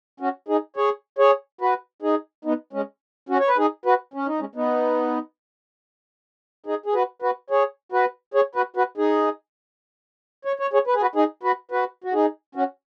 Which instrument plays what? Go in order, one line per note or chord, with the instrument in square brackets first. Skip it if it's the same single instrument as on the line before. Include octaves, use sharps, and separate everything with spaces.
[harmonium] C#4 F#4
D#4 G#4
G#4 C#5
G#4 C#5
F#4 B4
D#4 G#4
B3 D#4
G#3 C#4
C#4 F#4
C#5
B4
D#4 G#4
F#4 B4
C#4
D#4
G#3 C#4
B3 D#4
D#4 G#4
G#4
F#4 B4
F#4 B4
G#4 C#5
F#4 B4
G#4 C#5
F#4 B4
F#4 B4
D#4 G#4
C#5
C#5
G#4 C#5
B4
G#4
F#4 B4
D#4 G#4
F#4 B4
F#4 B4
F#4
D#4 G#4
C#4 F#4